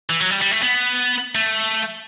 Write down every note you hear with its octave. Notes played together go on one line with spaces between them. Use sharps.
E3
F#3
G3
G3
A3
B3
A3